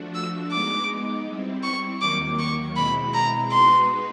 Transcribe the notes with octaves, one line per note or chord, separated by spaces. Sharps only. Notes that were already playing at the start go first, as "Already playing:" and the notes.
Already playing: F3 A3 D4 F#4
E6
G#3 B3 D#4 D6
G3 C4 E4
C#6
D#2 D#3 F#3 A#3 D6
C#6
B2 G#3 C4 E4 B5
A#5
G#3 B3 D#4 F#4 B4 C6